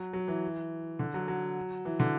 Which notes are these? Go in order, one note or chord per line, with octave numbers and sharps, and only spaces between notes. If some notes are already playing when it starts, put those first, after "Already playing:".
Already playing: F#3
F#3
E3
D3
F#3
F#3
E3
D3